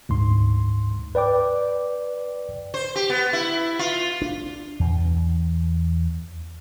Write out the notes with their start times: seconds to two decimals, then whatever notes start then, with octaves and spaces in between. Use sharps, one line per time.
0.09 D2 G#2 C6
1.15 B4 D5 G5 D6
2.74 C5
2.95 G4
3.10 B3
3.33 E4
3.79 F4
4.22 D4
4.80 E2